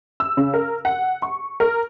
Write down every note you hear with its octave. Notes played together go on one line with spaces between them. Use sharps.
E6
C#3
A#4
F#5
C#6
A#4